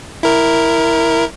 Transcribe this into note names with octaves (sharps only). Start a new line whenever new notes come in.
E4 A#4